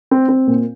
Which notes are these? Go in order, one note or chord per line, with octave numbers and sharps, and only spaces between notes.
C4
C4
A#2